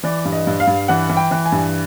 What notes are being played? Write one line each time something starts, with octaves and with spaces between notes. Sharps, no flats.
E3 D5
G2
D#5
G2
F5
G2
E3 F#5
E3
G5
E3
G#5
G2